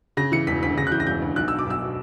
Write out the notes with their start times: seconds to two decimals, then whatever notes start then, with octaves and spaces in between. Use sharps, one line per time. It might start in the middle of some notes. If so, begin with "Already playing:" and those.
0.17 C#3 A#6
0.32 E3 C#7
0.47 E1 B6
0.63 D2 B6
0.77 C#3 A#6
0.87 F#6
0.92 E3 G6
1.00 A#6
1.07 E1 G6
1.22 D2
1.36 B1 F#6
1.48 B2 E6
1.59 D6
1.67 B1 E6
1.82 B2